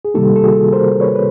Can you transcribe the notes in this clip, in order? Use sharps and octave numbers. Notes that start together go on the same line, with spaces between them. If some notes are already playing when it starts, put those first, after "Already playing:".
G#4
C3 D#3 G3 A#3 D#4 G4 A4
A4
F#4 G#4
A#4 C5
B4 C#5
B4